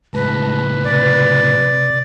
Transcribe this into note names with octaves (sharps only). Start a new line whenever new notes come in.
C#2 A2 G#3 B4 A5 A#6
C3 D5